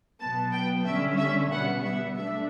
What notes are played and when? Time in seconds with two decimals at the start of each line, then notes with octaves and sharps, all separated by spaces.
0.20 B2 F#3 B3 A5
0.53 G5
0.86 D3 G3 C#4 E5
1.18 E5
1.51 B2 G3 B3 F#5
1.84 E5
2.16 A3 D4 E5